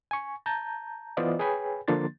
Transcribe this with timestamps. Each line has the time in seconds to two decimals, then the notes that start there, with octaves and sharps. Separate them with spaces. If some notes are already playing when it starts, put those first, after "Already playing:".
0.11 G#5 C#6
0.46 A5 A#5 G6
1.17 E3 B3 F4 C5 D5 D#5
1.39 G#4 B4 C#5 G5 G#5 B5
1.88 D3 F3 A#3 D4 C6 A6